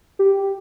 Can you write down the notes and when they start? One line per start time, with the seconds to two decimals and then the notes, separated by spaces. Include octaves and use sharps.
0.19 G4